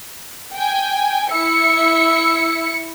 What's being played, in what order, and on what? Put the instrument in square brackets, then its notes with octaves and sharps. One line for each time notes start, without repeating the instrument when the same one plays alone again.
[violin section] G5 G#5
[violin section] E4 C#7 [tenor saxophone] E5